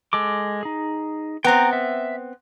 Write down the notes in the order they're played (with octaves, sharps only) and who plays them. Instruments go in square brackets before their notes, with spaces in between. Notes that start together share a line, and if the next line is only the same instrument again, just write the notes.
[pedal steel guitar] G#3 A4 D6
D#4 G#4
[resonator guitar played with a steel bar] B3 C4 [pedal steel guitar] G5 A#5
[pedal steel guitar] E5